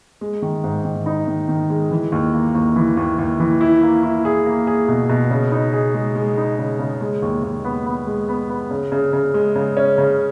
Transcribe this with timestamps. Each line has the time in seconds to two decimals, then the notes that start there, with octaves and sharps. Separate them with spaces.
0.21 G#3
0.42 D#3
0.64 G#2
0.85 D#3
1.06 D#4
1.28 D#3
1.49 D#3
1.70 G#3
1.91 E3
2.12 D#2
2.34 A#3
2.55 D#2
2.76 E3
2.97 D#2
3.19 D#2
3.40 E3
3.61 E4
3.83 A#3
4.03 E4
4.25 G#4
4.46 A#3
4.67 G#4
4.88 B2
5.09 B2
5.31 C#3
5.52 D#4
5.73 G#4
5.94 G#3
6.15 G#3
6.37 D#4
6.59 C#3
6.79 C#3
7.01 G#3
7.22 D#2
7.43 D#2
7.64 B3
7.86 B3
8.07 G#3
8.29 B3
8.49 B3
8.71 C#3
8.92 C#3
9.13 C#3
9.34 G#3
9.56 C#3
9.77 C#4
9.98 C#3